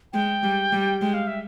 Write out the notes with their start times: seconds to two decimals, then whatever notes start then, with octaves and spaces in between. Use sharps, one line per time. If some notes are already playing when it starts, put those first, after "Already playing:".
0.13 G#3 G5
0.43 G3
0.73 G3
1.01 G#3 G5
1.14 F5
1.27 E5